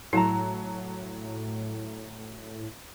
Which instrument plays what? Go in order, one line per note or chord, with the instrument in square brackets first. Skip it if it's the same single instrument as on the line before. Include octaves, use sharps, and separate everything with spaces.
[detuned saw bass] A2 [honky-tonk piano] F#3 [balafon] E4 [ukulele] A4 A5 A#5